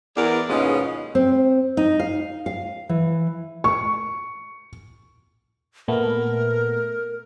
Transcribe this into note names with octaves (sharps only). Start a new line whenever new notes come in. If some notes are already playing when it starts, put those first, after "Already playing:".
E2 A#4 D5
D#2 G#2 B2 G#3 C#4 F4
C4
D#4
F5
F5
E3
C#6
A#2 A3 B3 A#4